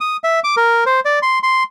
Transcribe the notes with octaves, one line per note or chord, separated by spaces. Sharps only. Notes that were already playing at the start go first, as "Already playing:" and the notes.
D#6
E5
D6
A#4
C5
D5
C6
C6